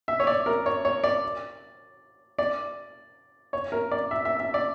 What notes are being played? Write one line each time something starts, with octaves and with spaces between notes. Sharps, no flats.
E5
C#5
D5
A#4
C#5
C#5
D5
D5
C#5
A#4
D5
E5
E5
E5
D5